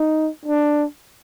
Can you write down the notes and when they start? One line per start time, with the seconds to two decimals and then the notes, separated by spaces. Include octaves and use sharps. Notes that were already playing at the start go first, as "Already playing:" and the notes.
Already playing: D#4
0.45 D4